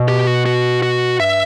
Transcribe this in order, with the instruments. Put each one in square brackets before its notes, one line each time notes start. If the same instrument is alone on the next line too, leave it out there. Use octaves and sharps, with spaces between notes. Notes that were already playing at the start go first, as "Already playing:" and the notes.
Already playing: [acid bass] B2
[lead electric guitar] G4
F#4
F#4
F#4
[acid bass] G2 [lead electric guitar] E5